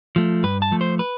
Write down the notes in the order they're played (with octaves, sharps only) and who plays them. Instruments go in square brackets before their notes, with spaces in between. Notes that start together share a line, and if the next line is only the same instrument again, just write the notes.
[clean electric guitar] F3 A3
G2 B4
A5
F3 A3
C5
B4